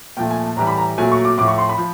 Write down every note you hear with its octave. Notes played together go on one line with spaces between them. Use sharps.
A#2 F3 A3 G5
G#5
A5
A2 E3 G3 A#5
B5
A#5
A#2 F#3 A3 G#5
C#6
D6
A2 F3 A3 D6
C#6
C6
B5
F3